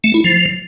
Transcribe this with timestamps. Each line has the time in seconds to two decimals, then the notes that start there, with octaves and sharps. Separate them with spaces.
0.04 A3
0.14 E4
0.24 F3